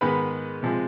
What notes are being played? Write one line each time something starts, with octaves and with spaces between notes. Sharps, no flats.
G#2 D#3 G#3 B3 B4 B5
C3 F3 G#3